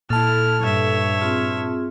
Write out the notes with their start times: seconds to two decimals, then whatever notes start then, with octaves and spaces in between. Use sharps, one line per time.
0.10 A#2 E4 A4 A5 F6
0.61 G2 C#5 E5
1.20 C4 F4 G#4